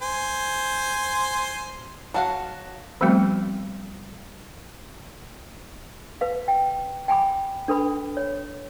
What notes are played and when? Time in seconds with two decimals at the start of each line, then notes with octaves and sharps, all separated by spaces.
0.02 C5 G#5
2.14 F#3 F#4 F5 F#5 A5
3.01 F3 G3 A3 B3 C4 F#4
6.21 B4 F5
6.48 G5
7.08 G5 G#5 B5 D6
7.68 D4 A4 B4 B5
8.17 C#5